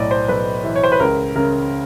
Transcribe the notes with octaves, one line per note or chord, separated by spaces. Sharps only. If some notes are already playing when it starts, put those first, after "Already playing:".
Already playing: B1 A2 D5 D#5
C5
B1 B4
E3
C#5
C5
B4
C#2 A#4
C#3 A#4